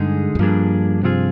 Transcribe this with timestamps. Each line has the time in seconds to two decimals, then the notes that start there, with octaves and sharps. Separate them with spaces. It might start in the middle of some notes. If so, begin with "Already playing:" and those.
Already playing: G2 D3 G#3 D#4 G#4
0.35 F2
0.39 G2 F3 A#3 D4 G#4
1.03 C3 F3 C4 F4 G#4